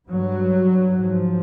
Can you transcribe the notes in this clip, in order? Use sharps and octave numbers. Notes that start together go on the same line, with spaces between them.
G2 F#3
G#2 F3